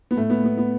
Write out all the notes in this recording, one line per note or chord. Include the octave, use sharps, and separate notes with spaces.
B3
A2 A3
B3
B3
B3